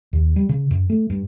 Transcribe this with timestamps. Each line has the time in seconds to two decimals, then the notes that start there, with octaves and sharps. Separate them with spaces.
0.13 D#2
0.36 G3
0.49 C#3
0.71 F#2
0.90 A3
1.10 G2